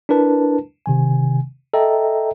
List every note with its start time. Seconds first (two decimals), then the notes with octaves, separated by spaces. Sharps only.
0.09 D4 E4 A#4 B4 A5
0.86 C3 D#3 G#5
1.74 A4 D#5 E5 G5 A#5